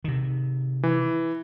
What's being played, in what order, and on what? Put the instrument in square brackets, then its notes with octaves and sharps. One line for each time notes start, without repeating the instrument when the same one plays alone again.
[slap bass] C3 D#3
[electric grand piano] E3